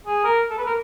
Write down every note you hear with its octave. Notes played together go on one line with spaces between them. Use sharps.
G#4
A#4
A4
B4
A#4